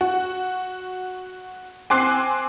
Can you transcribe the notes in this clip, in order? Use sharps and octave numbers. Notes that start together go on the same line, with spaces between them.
F#4
C4 G#5 C6 D6 F#6 C7